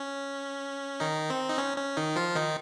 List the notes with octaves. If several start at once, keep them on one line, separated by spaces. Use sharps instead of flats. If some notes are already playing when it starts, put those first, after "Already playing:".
Already playing: C#4
D#3 D#4
C4
D#4
C#4
C#4
D#3 D#4
F3 F4
D#3 D#4